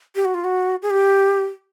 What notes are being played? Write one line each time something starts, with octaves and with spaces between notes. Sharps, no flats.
G4
F#4
F4
F#4
G#4
G4